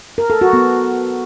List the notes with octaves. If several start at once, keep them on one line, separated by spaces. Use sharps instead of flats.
A#4
A4
F#4
B3